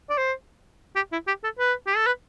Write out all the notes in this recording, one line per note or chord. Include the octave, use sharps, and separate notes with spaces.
D5
C5
G4
E4
G4
A4
B4
G4
A4
B4